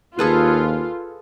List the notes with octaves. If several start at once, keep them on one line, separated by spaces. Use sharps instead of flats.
D#2 F4 G#4 A4 B4